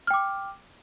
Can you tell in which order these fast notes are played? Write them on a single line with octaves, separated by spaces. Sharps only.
F6 G5 D6